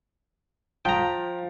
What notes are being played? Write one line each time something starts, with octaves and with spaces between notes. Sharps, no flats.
F3 G5 A#5